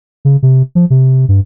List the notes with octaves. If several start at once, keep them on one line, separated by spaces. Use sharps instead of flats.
C#3
C3
F3
C3
G2